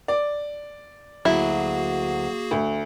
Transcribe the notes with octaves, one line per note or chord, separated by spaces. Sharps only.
D5
D2 G2 F#3 A#3 E4 F#4 G#4
D2